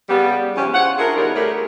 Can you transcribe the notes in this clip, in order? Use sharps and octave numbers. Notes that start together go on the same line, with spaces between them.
C#3 G3 B3
E2 C#3 F3 C#4 E4 G4
F4 C5 C#5 F#5
D4 E4 F4 G#4 A#4
E2 D3 G3 D#4 A#4 C#5
A3 E4 G4 G#4 A#4